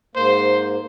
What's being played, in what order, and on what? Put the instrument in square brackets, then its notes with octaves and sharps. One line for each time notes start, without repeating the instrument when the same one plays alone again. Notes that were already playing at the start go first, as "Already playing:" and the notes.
[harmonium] G#2 A#3 [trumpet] C5